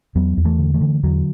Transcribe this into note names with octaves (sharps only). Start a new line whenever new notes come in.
E2 F#3 B3
E2
E3 A3
D3
E3 A3
D3
E2 D3 F#3